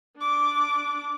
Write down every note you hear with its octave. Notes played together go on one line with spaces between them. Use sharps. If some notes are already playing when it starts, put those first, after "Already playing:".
D4 D6